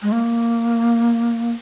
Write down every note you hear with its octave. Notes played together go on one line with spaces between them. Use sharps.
G#3
A#3